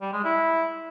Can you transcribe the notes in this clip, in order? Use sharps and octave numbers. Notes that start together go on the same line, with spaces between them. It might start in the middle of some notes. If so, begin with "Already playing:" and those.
G3
G#3
E4